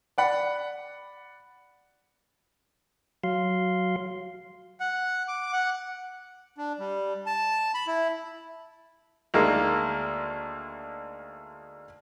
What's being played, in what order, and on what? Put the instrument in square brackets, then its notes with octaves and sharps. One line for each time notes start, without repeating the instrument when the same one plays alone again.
[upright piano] D5 F#5 B5
[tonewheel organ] F#3 F5 C6
[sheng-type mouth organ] F#5
D6
F#5
[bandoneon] D4
G3
A5
B5
E4
[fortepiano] D2 D#3 G#3 A#3